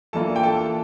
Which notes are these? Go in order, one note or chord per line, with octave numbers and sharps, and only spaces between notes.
E3 A#3 D4 F4 A4 A5
G5
A4 A5